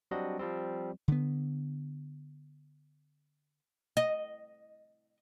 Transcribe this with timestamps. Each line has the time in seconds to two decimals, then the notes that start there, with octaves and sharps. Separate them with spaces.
0.11 F#3 G3 C4 D4 F#4 D#5
0.39 F3 G3 C4
1.08 D3 B3
3.97 D#5